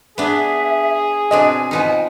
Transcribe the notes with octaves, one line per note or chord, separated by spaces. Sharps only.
B3 D4 G#4 E5
B2 C4 D4 D#5 G#5
F3 B3 D#4